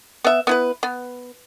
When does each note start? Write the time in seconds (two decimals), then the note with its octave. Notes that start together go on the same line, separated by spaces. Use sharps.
0.24 B3 E5
0.47 B3 E4 B4
0.83 B3